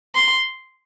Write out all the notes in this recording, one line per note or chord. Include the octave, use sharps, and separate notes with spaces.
C6